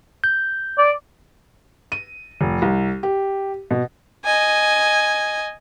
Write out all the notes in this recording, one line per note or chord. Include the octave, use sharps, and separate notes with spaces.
G6
D5
D#7
F1
C2
G4
B2
D#5 G#5